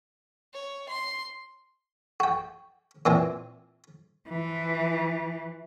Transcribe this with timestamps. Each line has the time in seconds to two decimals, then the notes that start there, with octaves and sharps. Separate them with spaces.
0.53 C#5
0.89 C6
2.20 F#4 G5
3.06 A#2 E3 C4
4.29 E3 F3